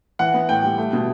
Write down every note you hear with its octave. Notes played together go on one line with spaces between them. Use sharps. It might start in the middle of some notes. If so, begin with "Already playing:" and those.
E3 F#5
B3
A2 G5
G3
A3
B2